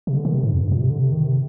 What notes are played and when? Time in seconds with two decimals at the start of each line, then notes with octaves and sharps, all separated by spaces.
0.07 C3
0.15 D3
0.25 D#3
0.34 C3
0.43 G#2
0.53 F2
0.62 G2
0.72 A#2
0.81 C3
0.90 D3
0.99 C3
1.12 D#3
1.24 C3